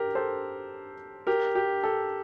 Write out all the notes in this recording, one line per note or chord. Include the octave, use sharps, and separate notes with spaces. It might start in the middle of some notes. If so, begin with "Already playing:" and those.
Already playing: G4 A#4
A4 C5
G4 A#4
G4
A4